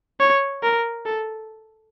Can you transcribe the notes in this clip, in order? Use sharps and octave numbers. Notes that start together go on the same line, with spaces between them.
C#5
A#4
A4